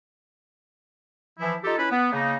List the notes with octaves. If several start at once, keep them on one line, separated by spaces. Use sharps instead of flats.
E3 F3 E4
D#4 F4 G4 A4
C#4 E4 B4
B3
C#3 A#3 D#4